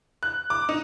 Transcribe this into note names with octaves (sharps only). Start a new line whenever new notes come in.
F#6
D6
D#4